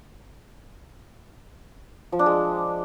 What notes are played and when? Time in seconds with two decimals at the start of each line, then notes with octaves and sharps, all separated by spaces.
2.12 F3
2.19 D4
2.26 G#3